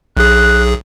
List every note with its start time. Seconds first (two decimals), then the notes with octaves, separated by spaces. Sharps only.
0.17 B1 G#4 F#6